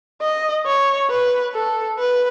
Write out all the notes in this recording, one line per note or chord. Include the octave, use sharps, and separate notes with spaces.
D#5
C#5
B4
A4
B4